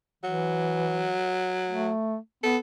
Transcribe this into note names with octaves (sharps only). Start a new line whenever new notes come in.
E3 F#3
A3
B3 A4